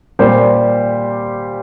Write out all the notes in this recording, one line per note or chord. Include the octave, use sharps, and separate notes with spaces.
A#2 G3 A#3 G4 C5